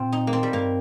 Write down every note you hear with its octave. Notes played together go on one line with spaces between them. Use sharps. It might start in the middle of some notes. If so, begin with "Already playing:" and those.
Already playing: A#2 C4 F4
D#4
A#3
C4
G3
G2 A#3